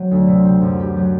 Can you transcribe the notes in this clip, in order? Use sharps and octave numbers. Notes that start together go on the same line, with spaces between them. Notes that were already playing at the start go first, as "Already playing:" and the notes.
Already playing: F#3 C4
D2
C3
C4
F#2
G4
F#3